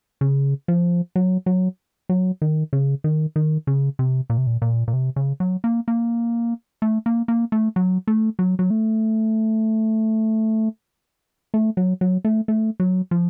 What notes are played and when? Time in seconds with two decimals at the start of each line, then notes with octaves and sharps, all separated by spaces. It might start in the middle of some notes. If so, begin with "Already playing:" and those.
0.21 C#3
0.68 F3
1.16 F#3
1.46 F#3
2.09 F#3
2.42 D#3
2.73 C#3
3.04 D#3
3.36 D#3
3.67 C#3
3.99 C3
4.30 A#2
4.38 C3
4.47 A#2
4.62 A#2
4.88 A#2
4.93 C3
5.16 C#3
5.40 F#3
5.64 A#3
5.88 A#3
6.82 A3
7.06 A#3
7.28 A#3
7.52 A3
7.76 F#3
8.07 A3
8.39 F#3
8.59 F#3
8.70 A3
11.54 A3
11.77 F#3
12.01 F#3
12.25 A3
12.48 A3
12.80 F#3
13.11 F3